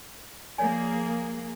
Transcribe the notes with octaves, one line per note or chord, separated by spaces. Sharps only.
F3 A#3 G#4 C#5 D5 G#5